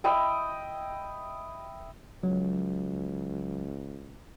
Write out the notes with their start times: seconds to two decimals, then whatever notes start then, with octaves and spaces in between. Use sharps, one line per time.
0.04 E4 D#5 G5
2.23 C#2 F#3